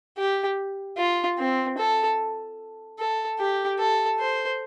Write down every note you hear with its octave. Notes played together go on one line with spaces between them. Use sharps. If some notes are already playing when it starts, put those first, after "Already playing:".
G4
F4
C4
A4
A4
G4
A4
C5